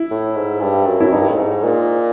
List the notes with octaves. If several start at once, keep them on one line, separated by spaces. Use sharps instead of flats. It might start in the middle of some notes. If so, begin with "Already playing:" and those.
Already playing: E4
A2
G#2
G2
F#2
F#2 E4
G2 D#4
A2
G#2
A#2